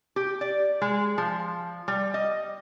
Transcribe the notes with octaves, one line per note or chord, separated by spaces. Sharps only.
G4
D5
G#3
F3
G3
D#5